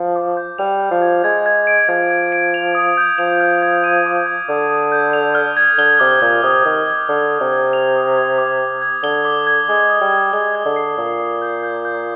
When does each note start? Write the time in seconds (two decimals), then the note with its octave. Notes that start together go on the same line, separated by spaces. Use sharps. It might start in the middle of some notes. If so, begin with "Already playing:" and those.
Already playing: F3
0.15 D6
0.37 G6
0.58 G3 F7
0.80 F6
0.91 F3
1.02 G#6
1.24 G#3 G#6
1.46 G#6
1.67 D7
1.89 F3 G#6
2.10 G#6
2.32 D7
2.54 F7
2.75 D#6
2.97 G6
3.18 F3 F7
3.40 F6
3.62 G#6
3.84 D#7
4.06 D6
4.27 G6
4.49 D3 D#6
4.70 D#6
4.92 G6
5.13 F7
5.35 F6
5.57 G#6
5.78 D3 G7
6.00 C3 D6
6.22 A#2 G#6
6.43 C3 D#6
6.65 D#3 D#6
6.86 G#6
7.09 D3 D#6
7.30 D#6
7.41 C3
7.52 G#6
7.73 F7
7.96 D#6
8.17 G#6
8.38 D6
8.59 D6
8.82 G#6
9.03 D3 G7
9.25 D6
9.47 G#6
9.68 G#3 D#6
9.90 D#6
10.01 G3
10.12 G#6
10.33 G#3 G7
10.55 G#6
10.65 D3
10.76 C7
10.98 A#2 D#6
11.20 D#6
11.42 G6
11.63 G6
11.85 G6